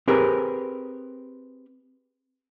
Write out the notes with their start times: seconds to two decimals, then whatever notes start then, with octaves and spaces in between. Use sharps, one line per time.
0.08 C4 G4 G#4 A#4 B4